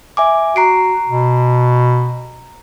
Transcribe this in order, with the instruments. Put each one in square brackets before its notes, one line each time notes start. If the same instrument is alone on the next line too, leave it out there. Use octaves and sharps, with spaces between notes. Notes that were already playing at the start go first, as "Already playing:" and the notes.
[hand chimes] E5 G#5 D6
[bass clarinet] F#4 [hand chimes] A#5 C7 D7
[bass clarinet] B2